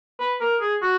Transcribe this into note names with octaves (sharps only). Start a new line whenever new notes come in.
B4
A#4
G#4
F#4